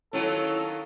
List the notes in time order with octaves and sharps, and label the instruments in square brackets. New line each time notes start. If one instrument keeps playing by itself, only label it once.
[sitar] D#3 F#3 F4 [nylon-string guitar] C#4 [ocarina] E4 [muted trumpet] A4